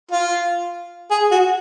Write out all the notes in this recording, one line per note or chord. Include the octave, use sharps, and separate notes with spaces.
F4
G#4
F#4